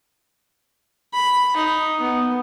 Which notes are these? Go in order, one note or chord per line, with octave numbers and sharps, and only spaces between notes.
B5
D#4
B3